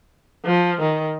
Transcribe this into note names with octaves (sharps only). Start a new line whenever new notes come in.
F3
D#3